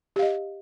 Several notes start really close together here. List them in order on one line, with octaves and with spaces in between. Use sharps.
G4 F5 D#5